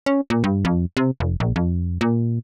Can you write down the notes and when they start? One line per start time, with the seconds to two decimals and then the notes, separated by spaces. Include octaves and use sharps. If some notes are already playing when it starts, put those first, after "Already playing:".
0.06 C#4
0.30 A#2
0.44 G2
0.65 F2
0.97 C3
1.20 F1
1.40 A#1
1.56 F2
2.01 A#2